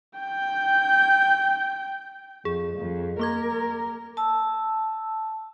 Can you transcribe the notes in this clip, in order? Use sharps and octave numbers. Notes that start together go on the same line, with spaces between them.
G5 G6
F2 G#4
F2
A#3 A#4 D6 G#6
A5 E6